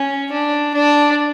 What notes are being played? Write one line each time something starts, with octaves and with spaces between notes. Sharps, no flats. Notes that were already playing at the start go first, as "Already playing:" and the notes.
Already playing: C#4
D4
D4